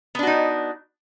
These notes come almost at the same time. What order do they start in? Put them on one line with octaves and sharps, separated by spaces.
B3 D4 F#4 D#4